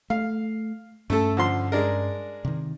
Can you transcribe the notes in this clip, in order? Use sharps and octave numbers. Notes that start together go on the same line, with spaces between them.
A3 F5
G2 A3 C#4 A4
D3 F3 C6
G#3 D4 A#4
C3 D#3